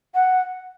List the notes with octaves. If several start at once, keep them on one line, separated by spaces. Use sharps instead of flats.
F#5